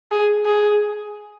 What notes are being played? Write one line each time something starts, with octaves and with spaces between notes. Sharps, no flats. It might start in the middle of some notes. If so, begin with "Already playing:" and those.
G#4
G#4